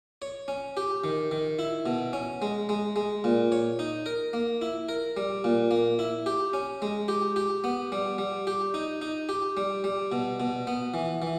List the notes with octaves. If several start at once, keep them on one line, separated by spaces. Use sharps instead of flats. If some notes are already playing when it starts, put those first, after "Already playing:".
C#5
C#4
G4
D#3
D#3
E4
B2
C#4
G#3
G#3
G#3
A#2
C#5
D#4
A#4
A#3
E4
A#4
G3
A#2
A#3
E4
G4
C#4
G#3
G4
G4
B3
G3
G3
G4
D#4
D#4
G4
G3
G3
B2
B2
B3
E3
E3